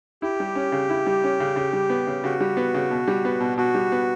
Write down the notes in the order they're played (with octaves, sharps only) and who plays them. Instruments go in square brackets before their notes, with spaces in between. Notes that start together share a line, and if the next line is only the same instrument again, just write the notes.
[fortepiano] E4 [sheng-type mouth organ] G4
[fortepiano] G3
C#4
C#3
E4
G3
C#4
C#3
C#3
G3
B3
C#3
[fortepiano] C#3 [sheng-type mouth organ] F#4
[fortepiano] G3
B3
C#3
B2
G3
B3
B2
[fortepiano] B2 [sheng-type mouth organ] F#4
[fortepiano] G3
B3